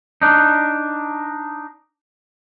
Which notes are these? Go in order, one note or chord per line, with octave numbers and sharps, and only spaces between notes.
D4 D#4